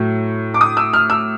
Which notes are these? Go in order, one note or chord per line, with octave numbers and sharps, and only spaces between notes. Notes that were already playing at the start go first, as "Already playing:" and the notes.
Already playing: A2 F#3 A3
D6
D#6
E6
F6
E6